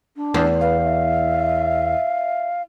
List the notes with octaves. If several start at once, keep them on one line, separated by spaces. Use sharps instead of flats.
D4
E2
B4 F5
E5